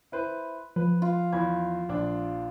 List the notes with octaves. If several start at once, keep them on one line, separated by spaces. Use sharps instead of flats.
E4 B4 C5
F3 B4
F4
E2 B5 G#6
A#1 D4